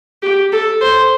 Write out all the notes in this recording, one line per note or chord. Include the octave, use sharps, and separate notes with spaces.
G4
A4
C5